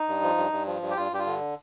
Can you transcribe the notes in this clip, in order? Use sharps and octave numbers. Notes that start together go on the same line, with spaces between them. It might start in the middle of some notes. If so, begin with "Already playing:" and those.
Already playing: D#4
G2
F3
G2
G2
F3
G2
G4
G2 F4
G2 G4
F4
D3